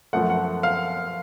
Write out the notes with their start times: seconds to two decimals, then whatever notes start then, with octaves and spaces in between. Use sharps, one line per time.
0.13 F#2 F3 A3 F#5
0.30 F#5
0.63 F5